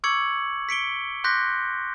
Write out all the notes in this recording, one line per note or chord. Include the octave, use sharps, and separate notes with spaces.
C#6 D6 E6 G#6 C#7 F#7
B6 C#7 D7 G7
C6 D6 F#6 G6 A#6 B6